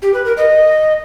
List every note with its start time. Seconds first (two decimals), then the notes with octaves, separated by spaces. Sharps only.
0.02 G4
0.14 B4
0.25 A#4
0.37 D#5